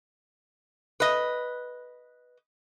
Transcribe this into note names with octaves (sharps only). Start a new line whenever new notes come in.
B4 D#5